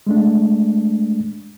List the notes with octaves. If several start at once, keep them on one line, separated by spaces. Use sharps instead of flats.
G#3 A3 D4